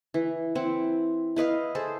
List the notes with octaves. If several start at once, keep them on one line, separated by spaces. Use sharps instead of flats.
E3
C4 E4 F#5
E4 B4 D#5 F5
G#4 A4 C5